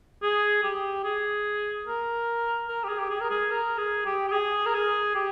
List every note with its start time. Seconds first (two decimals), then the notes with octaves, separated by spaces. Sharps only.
0.22 G#4
0.63 G4
1.04 G#4
1.87 A#4
2.68 A#4
2.84 G4
2.89 G#4
2.99 G4
3.10 G#4
3.20 A#4
3.30 G#4
3.51 A#4
3.78 G#4
4.05 G4
4.28 G4
4.32 G#4
4.66 A#4
4.74 G#4
5.15 G4